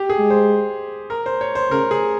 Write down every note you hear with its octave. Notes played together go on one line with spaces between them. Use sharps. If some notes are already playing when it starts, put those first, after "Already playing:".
Already playing: G4
G#4
G#3
C5
A#4
C5
C#5
C5
C#3 A#4
G#4